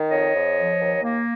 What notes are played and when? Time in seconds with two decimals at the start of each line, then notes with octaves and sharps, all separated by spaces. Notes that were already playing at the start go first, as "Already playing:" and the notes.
Already playing: D#3
0.10 F2 C#5 D#5
0.33 F2
0.57 F3
0.79 D#2
1.03 A#3